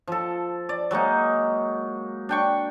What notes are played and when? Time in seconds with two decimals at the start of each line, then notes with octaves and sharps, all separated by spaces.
0.08 F3 A4
0.69 D5
0.91 F#3 G#3 A#3 D#4
2.29 D4 G5 C#6